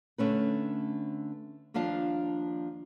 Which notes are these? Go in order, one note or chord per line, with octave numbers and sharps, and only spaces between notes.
D3 A3 C#4 B4
D#2 F3 D4 F5 A5